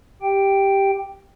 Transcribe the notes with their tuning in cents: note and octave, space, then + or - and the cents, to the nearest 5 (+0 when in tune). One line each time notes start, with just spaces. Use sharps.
G4 +0 G5 +0